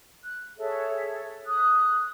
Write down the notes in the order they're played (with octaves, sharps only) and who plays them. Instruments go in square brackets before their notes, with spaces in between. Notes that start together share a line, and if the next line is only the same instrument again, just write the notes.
[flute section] F#6
G#4 A4 C#5 E5
D#6 F#6